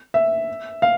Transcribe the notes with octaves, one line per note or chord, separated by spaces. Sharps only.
E5
F5